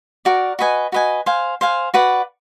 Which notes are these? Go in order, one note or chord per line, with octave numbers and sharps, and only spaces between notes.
F#4 A#4 D5
F#4 B4 D#5 G#5
F#4 B4 D#5 G#5
C5 F5 G#5
C5 F5 G#5
F#4 B4 D5 F#5